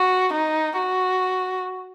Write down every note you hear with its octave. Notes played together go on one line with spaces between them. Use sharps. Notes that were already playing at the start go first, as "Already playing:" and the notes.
Already playing: F#4
D#4
F#4